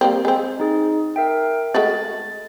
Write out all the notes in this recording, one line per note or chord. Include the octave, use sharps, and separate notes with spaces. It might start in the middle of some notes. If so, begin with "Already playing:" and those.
G3 A#3 C4
G#3 C4
D#4 G#4
A#4 E5 G5
G#3 A3 F#4 A6